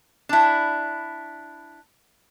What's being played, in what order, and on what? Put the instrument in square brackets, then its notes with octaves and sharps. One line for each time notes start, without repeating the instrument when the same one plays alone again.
[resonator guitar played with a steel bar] D4 E4